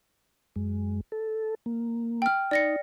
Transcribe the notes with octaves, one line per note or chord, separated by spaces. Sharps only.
F#2 G#3
A4
A#3
G5 F6
D#4 D5 A#6 C#7